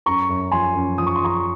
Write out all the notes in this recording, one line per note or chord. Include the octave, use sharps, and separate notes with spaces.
F#2 A#5 C#6
F#2
F3 G#5 C6
F#2
F3 D#6
C#6
C6
F3 A#5 C#6